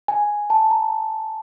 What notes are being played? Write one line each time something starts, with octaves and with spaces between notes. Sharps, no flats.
G#5
A5
A#5